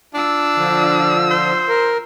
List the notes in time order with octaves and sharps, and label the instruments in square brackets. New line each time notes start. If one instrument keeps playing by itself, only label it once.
[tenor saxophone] D4 [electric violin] F4 E6
[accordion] D3 F3
[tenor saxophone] C5
[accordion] A#4